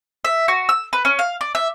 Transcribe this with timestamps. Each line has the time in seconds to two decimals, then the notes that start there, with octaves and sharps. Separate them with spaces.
0.25 E5
0.48 F#4
0.69 E6
0.93 B4
1.05 C#4
1.19 F5
1.41 D5
1.55 E5